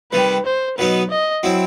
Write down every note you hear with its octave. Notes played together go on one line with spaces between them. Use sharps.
C3 D#3 G3 B4
C5
B2 F#3 B3 D#4 B4
D#5
F#3 C4 E4